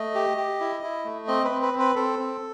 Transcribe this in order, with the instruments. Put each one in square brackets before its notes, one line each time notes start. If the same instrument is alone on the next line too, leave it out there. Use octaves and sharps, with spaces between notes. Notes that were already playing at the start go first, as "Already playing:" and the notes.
Already playing: [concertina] A3 D#5
G4
G4
E4
E4
A3
C4 D#5
B4
C4
B4
C4
B4
C4 A4
C4